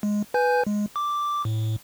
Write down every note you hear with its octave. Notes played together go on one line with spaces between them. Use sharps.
G#3
B4 G#5 G6
G#3
D6
A2